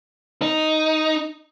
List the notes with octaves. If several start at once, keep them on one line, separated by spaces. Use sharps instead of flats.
D#4